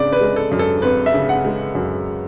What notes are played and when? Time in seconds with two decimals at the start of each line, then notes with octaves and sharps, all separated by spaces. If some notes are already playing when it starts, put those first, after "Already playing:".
Already playing: G#1 C#3 D5
0.13 B4
0.21 G#3
0.36 A4
0.51 F#2
0.59 A4
0.82 G#1 B4
1.06 E5
1.14 C#3
1.29 F#5
1.45 G#3
1.75 F#2